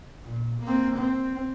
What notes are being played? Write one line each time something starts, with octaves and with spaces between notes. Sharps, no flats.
A#2
A#3 C4
C4